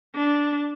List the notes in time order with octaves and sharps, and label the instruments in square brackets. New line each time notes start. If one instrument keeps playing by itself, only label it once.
[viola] D4